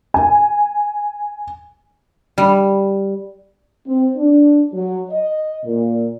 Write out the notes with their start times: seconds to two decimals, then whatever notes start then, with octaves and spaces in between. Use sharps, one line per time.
0.14 G#5
2.38 G3
3.86 C4
4.16 D4
4.72 F#3
5.11 D#5
5.64 A#2